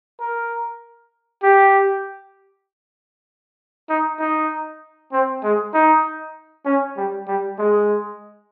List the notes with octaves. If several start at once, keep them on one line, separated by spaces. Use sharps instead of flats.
A#4
G4
D#4
D#4
C4
G#3
D#4
C#4
G3
G3
G#3